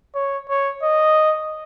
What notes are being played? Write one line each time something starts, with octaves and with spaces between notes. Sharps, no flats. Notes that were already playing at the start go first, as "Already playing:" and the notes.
C#5
C#5
D#5